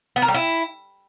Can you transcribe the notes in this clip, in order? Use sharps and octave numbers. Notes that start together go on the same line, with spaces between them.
B3
A#4
G3
E4